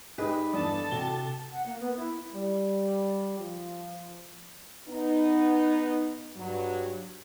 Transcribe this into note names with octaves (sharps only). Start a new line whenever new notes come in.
G#2 G4 G#4 B4 D#5
E2 G2 A4 D5 A5 D#6
C3 F#4 G7
F#5
A#3
B3
E4
G3
F3
B3 D#4
G2 F#3